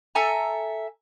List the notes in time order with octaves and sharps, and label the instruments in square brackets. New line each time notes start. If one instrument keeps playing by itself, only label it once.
[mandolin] A4 E5 G#5 A#5